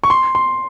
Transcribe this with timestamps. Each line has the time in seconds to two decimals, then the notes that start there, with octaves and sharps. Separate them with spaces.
0.04 C#6
0.10 C6
0.35 C6